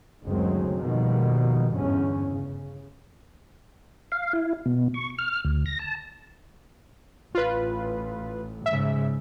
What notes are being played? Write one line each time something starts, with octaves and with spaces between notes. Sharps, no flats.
F#1 D2 D#3 F#3 G#3 C4
F2 B2 D#3 F3 G3 A#3
G1 E2 G#2 D3 C#4
C#3
F5
E4
B2
C#6
F6
D2
A#6
A5
A1 F4 B4
G#2 C#3 E5